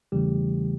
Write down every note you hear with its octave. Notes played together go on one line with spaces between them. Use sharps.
E2 C#3 E3 G3 A3 G4